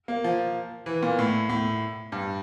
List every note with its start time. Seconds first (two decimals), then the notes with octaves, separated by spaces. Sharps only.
0.08 A#3
0.24 F3
0.86 E3
1.03 A#2
1.19 A2
1.49 A2
2.12 G2